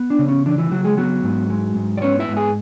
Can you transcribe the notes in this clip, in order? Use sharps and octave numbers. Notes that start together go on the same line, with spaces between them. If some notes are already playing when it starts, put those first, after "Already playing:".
Already playing: B3
D4
C#3
C#4
E3 D4
E3 E4
C#3 F#3 F#4
G#3 G#4
F#3 B3 F#4
G#2
G#3
G#2
D5
B3 C#4 C#5
E4 E5
G#2
G#4 G#5